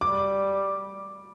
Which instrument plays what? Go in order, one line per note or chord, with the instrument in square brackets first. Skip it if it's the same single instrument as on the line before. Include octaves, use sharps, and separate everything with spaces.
[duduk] G3 [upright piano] D6